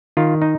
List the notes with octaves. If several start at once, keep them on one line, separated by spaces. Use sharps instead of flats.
D#3 F4
D#4